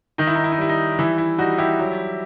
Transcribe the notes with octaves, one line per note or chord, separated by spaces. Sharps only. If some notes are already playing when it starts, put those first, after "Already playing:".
D#3 D#4
E4
D#4
E4
D#4
G3 E4
D#4
E3 E4
E4
G3 D#4 F#4
E4 G4
F#3